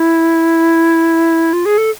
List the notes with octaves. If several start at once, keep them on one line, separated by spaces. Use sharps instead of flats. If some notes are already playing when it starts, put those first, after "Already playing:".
Already playing: E4
F4
G#4
A4